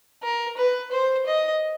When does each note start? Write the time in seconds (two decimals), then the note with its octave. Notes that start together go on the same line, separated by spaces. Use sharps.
0.23 A#4
0.56 B4
0.92 C5
1.26 D#5